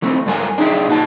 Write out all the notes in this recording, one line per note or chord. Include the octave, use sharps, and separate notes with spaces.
E3 A3 C4
G#2 G3 A4 A#4 G#5
D4 D#4 G#4 E5 G5
A#2 F#4 A5